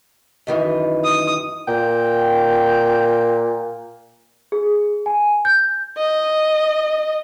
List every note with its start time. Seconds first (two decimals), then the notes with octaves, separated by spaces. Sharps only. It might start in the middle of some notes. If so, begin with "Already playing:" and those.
0.47 F#2 D#3 E3
1.04 D#6
1.68 A#2 G5
4.52 G#4
5.06 G#5
5.45 G6
5.98 D#5